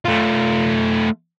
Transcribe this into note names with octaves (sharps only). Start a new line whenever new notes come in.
A3 F4